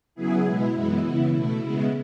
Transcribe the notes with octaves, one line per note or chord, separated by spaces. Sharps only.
C#3 F#3 B3 E4 G#4
B2 G#3 B3 E4
F#2 E3 G#3 B3
C#3 E3 B3
B2 A3 E4
C#3 G#3 B3 E4